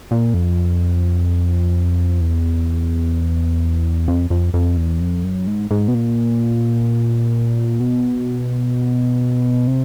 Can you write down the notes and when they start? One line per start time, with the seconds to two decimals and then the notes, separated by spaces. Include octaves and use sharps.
0.11 A#2
0.34 F2
2.21 E2
4.08 F2
4.30 F2
4.54 F2
4.77 E2
5.00 F2
5.24 F#2
5.47 G#2
5.71 G#2
5.88 B2
5.94 A#2
7.80 B2
9.67 C3